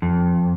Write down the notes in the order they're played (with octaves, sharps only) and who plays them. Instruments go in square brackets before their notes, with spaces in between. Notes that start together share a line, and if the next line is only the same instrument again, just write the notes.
[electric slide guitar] F2